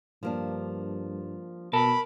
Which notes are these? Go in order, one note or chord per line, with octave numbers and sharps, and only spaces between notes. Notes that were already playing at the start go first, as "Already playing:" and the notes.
G2 F3 A#3 D4
B2 A#4 A5 B5